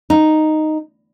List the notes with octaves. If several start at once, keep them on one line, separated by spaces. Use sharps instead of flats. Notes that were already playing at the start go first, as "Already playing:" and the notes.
D#4